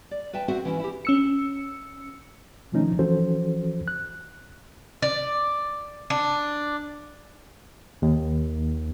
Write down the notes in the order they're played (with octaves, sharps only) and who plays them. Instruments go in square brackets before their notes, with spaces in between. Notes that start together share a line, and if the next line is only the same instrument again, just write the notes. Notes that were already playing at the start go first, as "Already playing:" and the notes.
[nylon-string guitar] D5
B4 E5 G5 A5
C4 F#4 C5 E5 F#5
E3 C#4 E4
E4 G4
[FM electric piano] C#4 E6 C#7
[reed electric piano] B2 D#3 F3 A3 C#4 D#4
E3 F3 C#4 F#4 A4 C5
F#6
[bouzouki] D5
D4
[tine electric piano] D#2